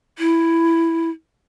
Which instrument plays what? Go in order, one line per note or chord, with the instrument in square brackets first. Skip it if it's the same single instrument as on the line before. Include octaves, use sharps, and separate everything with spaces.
[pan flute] E4